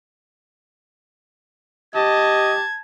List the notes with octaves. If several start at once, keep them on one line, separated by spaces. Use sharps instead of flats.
G4 D#5 A5 G#6